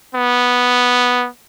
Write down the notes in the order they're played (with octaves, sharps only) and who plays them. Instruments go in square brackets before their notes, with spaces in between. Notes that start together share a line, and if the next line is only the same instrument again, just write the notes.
[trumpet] B3